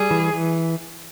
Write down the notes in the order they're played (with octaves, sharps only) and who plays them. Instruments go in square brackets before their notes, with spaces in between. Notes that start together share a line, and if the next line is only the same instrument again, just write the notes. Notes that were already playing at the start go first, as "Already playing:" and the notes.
Already playing: [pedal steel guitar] G3 [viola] G#4
[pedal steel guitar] E3
E3